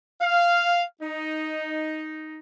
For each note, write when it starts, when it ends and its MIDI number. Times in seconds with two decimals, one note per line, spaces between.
0.21 0.83 77
1.01 2.39 63